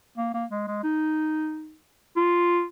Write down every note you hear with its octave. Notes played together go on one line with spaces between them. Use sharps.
A#3
A#3
G#3
G#3
D#4
F4